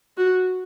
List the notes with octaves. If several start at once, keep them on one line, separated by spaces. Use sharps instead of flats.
F#4